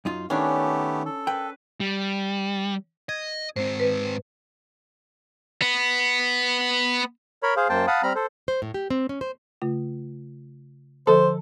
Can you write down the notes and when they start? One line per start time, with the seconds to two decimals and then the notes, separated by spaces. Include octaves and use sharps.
0.05 F#2 D#4 F4
0.30 D#3 A3 B3 C#4 D4 G4
1.05 A4
1.27 B4 G5
1.80 G3
3.09 D#5 G#6
3.56 G#2 C4 C5
3.80 B4
5.62 B3
7.43 A#4 C#5 B5
7.57 G#4 C5 F5
7.69 F#2 A#3 C5 G5 A5
7.87 F5 F#5 A5 B5 D#6
8.03 G3 C4 A#5 B5 F6
8.15 A4 C5
8.48 C5
8.62 A2
8.74 G4
8.90 C4
9.09 C#4
9.21 C5
9.62 C#3 A3 F4
11.07 D3 F3 A4 C5 D#5